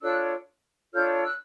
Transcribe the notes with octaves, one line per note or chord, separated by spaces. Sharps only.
D4 F4 A4 C#5 E6 F#6
D4 F4 A4 C#5 F6 G6
E6 F#6